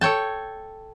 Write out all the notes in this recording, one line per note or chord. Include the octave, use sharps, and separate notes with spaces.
A4 C#5 G5 A5